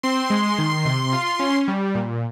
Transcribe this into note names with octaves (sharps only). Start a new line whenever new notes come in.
C4 C6
G#3
D#3
C3
F4
C#4
G3
A#2